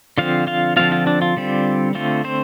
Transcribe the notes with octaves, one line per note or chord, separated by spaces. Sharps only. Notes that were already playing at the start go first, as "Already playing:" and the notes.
D3 F3 C4 F4 F5
F4 F5
D3 F3 A3 C4 F4 F5
F4
D4
F4
D3 G3 C4
D3 A3 C4 F4
C4 C5